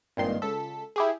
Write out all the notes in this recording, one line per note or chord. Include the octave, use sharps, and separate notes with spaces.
G#1 G2 A#2 D#3 C6
C#2 A4 E6 B6
E4 G4 G#4